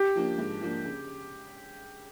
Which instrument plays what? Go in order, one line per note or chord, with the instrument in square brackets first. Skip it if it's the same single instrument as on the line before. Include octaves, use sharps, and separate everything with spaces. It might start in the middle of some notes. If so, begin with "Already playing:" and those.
Already playing: [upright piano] G4
[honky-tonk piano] F3 A#3 D4
G#2
F3 A#3 D4
C#3